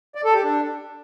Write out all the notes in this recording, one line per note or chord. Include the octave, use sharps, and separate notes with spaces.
D5
A4
G4
D4